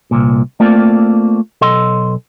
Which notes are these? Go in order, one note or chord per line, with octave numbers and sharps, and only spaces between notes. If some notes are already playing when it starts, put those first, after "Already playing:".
C2 A#2
A3 A#3 C4 F4 D5
B1 A4 D#5 C6